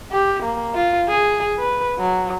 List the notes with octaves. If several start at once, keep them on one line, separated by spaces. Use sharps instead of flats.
G4
A#3
F4
G#4
B4
F#3